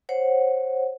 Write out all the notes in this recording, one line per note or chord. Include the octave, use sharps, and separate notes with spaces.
C5 C#5 F#5